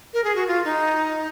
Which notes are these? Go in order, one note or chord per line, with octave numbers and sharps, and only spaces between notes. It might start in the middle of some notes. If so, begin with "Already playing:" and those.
A#4
G#4
F#4
F4
D#4